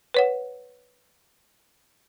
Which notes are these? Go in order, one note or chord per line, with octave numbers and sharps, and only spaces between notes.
B4 C#5 F#5